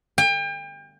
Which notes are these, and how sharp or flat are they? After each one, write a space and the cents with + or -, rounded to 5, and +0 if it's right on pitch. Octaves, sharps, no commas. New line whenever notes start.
G5 +35